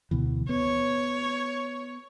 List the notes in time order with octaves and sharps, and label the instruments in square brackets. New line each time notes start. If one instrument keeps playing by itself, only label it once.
[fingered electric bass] D2 B2 E3
[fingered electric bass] B3 [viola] C#5